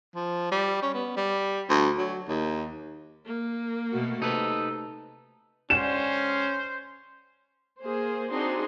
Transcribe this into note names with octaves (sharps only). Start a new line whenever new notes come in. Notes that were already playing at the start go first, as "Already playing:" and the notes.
F3
G3
C#4
B3
G3
D2
F#3
D#2
A#3
B2 A3 F#4
C3 D#4 A4 B4
G#2 D3 C#4 C5 G5 E7
A#3 G#4 C5
C4 D4 D#4 F#4 G#4 C6